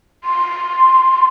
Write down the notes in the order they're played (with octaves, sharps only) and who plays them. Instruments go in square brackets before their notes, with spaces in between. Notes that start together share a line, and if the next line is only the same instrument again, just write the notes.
[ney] C6